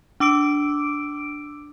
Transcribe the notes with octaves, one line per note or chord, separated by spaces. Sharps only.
D4 D6 E6 D7